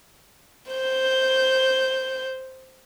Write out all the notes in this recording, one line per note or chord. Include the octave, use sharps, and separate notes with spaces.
C5 G6